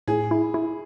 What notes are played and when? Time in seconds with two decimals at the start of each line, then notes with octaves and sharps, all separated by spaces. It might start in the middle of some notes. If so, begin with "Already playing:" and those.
0.08 A2 G#4
0.31 E4
0.54 E4